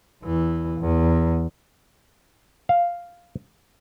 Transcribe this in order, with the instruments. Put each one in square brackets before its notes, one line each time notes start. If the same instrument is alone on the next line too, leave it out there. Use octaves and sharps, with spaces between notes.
[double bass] E2 E3
E2
[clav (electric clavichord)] F5